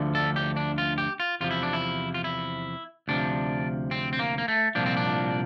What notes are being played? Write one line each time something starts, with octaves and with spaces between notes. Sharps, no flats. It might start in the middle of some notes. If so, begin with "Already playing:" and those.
Already playing: D2 D3 F3
A4
G4
D4
F4
G4
F4
E2 C3 F3 F4
E4
D4
E4
F4
E4
D2 C3 F3 D4
C4
C4
A#3
A#3
A3
C2 A#2 F3 D4
C4
D4